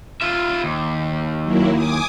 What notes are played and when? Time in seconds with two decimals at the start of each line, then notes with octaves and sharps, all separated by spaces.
0.21 F4 E5
0.64 D#2
1.44 F#3 A#3 E4
1.73 G#5 D6 D#6